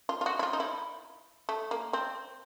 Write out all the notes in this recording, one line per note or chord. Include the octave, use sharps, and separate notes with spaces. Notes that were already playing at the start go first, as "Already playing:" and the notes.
F4
F4
F#4
E4
F4
D#4
E4
A3
A#3
C4